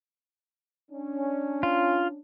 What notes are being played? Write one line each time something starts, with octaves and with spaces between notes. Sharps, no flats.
C#4 D4
F4